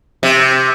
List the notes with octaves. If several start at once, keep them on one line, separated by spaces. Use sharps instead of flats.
C3